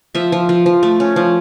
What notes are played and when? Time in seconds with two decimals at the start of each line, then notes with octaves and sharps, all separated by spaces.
0.15 F3 E5
0.32 F3
0.49 F3
0.66 F3
0.83 A3
1.00 C#4
1.16 F3